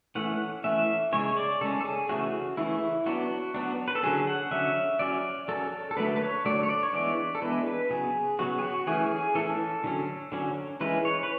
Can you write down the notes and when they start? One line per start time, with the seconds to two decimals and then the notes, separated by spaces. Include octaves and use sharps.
0.15 E3 A3 C#4 F#5
0.64 E3 A3 C#4 E5
1.12 C#3 G#3 C#4 C#5
1.37 D5
1.61 C#3 G#3 C#4 A4
1.80 A4
1.85 G#4
2.09 C#3 E3 A3 C#4 F#4
2.57 C#3 E3 A3 C#4 E4
3.06 F#3 B3 D4 F#4
3.54 F#3 B3 D4
3.88 B4
3.95 A4
4.03 D3 F#3 C#4 G#4
4.27 F#5
4.51 D3 F#3 C#4 E5
4.99 F#3 C#4 D5
5.48 F#3 C#4 A4
5.91 A4
5.97 D3 F#3 A3 B4
6.16 B4
6.21 C#5
6.45 D3 F#3 A3 D5
6.63 C#5
6.69 D5
6.83 C#5
6.93 E3 G#3 B3 D4 D5
7.35 A4
7.42 E3 G#3 B3 D4 B4
7.66 B4
7.90 C#3 F#3 B3 G#4
8.39 C#3 F#3 B3 F#4
8.59 G#4
8.62 F#4
8.87 E3 A3 C#4 G#4
9.11 G#4
9.35 E3 A3 C#4 A4
9.84 D3 F#3 C#4
10.32 D3 F#3 C#4
10.81 E3 G#3 C#4 B4
11.05 C#5
11.23 B4